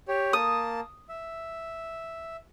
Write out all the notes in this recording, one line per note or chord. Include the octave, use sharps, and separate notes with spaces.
G4 C#5
A#3 A5 D#6
E5